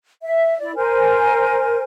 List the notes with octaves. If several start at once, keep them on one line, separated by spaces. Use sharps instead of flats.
E5
E4 D5
A#4 C5 G#5